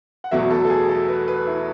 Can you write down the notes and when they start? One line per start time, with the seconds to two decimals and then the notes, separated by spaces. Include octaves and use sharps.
0.24 F#5
0.31 E2 B2 F#3 A3 E5
0.51 A4
0.65 A4
0.70 G#4
0.89 A4
1.08 B4
1.28 B4
1.47 E4